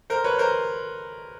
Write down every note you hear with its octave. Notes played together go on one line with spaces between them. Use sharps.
A#4 C5
B4 C#5
A#4 C5